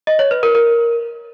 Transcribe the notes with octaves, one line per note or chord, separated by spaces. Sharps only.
D#5
C#5
B4
A#4
A#4